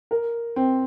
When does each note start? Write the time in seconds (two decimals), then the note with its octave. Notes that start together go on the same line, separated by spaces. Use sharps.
0.11 A#4
0.56 C4